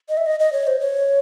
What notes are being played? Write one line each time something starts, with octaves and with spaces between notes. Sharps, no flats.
D#5
E5
D#5
D#5
C#5
C5
C#5